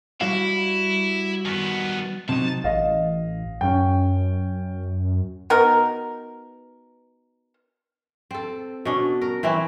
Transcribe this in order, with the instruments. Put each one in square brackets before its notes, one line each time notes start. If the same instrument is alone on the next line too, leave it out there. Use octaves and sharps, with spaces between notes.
[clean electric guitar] G3 F#4 F5 [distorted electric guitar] E4
[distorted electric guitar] D#3 B3
[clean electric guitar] C3 F#3 D#4 [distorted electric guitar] A5
[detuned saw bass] A1 [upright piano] D#5 F5
[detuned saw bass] F#2 [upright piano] C#4 G5
[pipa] B3 D#4 F#4 A#4
[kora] C4 A4
B2 C#4 D4
A#4
E3 C4 C#4 E4